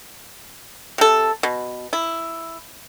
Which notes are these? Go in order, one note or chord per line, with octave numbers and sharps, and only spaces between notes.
C3 A4
B2
E4